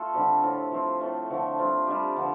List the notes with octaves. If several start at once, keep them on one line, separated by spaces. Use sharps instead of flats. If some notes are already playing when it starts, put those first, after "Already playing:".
Already playing: A3 F4 A4
D3 G3 C4 G4
A2 A3 C4 F4
F3 A3 C4 F4
A2 A3 C4
D3 F3 A3
G3 C4 F4
G3 D4 G4
D3 F3